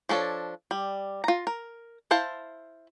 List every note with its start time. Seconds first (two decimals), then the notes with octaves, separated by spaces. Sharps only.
0.09 F3 D4 A4 C#5
0.71 G3
1.24 F4 A#5
1.47 A#4
2.11 E4 C5 F5 A5